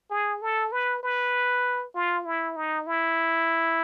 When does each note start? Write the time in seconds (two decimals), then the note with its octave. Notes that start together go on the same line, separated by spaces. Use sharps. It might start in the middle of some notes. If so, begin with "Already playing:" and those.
0.11 G#4
0.42 A4
0.72 B4
1.03 B4
1.95 F4
2.26 E4
2.56 D#4
2.87 E4